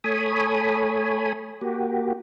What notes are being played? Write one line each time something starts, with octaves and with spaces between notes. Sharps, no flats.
A3 A4 C#5 G#5 B5 D#6
A#3 F#4 G4